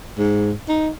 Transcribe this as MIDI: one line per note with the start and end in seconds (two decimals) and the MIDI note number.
0.18 0.52 44
0.69 0.89 63